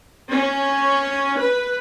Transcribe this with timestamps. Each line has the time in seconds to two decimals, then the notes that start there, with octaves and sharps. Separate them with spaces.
0.32 C#4
1.39 B4